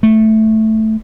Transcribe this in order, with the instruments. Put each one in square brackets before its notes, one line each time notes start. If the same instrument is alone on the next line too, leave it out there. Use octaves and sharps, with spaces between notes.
[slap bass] A3